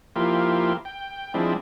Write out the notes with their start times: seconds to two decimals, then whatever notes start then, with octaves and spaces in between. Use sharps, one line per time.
0.16 F3 A#3 E4 F4 G4
0.85 G5
1.34 F3 G#3 C4 D4 E4